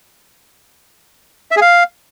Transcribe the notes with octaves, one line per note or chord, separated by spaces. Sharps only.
E5
G#4
F5